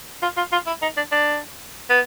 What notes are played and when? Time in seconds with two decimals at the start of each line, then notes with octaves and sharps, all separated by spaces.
0.22 F4
0.37 F4
0.52 F4
0.67 E4
0.82 D#4
0.97 D4
1.12 D4
1.90 B3